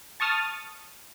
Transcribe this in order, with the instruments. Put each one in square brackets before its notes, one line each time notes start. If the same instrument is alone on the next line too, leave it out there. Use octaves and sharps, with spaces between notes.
[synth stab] A5 C#6 D#6 F6 A6